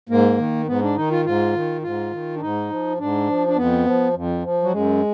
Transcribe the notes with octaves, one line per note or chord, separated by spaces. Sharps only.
G#2 A#3
D#3
G#2 B3
D4
D#3 D#4
F4
G#2 F4
D#3
G#2 F4
D#3
D4
G#2 D#4
F3
G#2 D4
F3
D4
F2 B3
F3
F2
F3
F#3
F#2 G#3